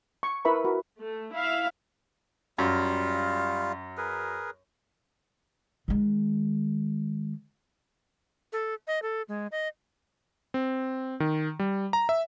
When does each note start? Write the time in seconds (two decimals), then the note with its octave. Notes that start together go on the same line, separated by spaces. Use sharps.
0.23 C#6
0.45 E4 A#4 B4 E5 B5 C#6
0.64 F#4 A#4
0.98 A3
1.32 E4 E5 F5
2.58 F#2 G3 F4 F5
3.97 G#4 A#4 B4
5.88 D#3 G#3
8.53 A4
8.87 D#5
9.02 A4
9.28 G#3
9.52 D#5
10.54 C4
11.20 D#3
11.59 G3
11.93 A#5
12.09 E5